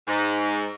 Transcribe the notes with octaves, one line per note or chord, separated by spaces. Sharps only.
G#2